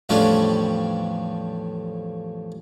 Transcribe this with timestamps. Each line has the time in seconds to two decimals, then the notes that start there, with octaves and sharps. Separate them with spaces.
0.09 E2 A2 F3 G3 C#4 D4